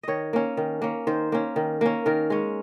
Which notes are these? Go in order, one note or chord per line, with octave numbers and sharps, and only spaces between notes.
D#3 C#5 D#5
A#3 C#4
D#3
A#3 C#4
D#3 C5
A#3 C#4
D#3
A#3 C#4
D#3 A#4
G#3 C#4